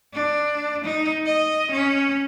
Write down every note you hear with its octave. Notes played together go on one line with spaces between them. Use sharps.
D4
D#4
D#5
C#4